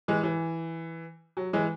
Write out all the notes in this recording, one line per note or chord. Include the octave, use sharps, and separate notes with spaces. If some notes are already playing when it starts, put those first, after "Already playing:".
E3 G#3
E3
F#3
E3 G#3